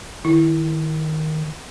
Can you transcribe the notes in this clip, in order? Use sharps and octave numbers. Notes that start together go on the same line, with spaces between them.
D#3 E4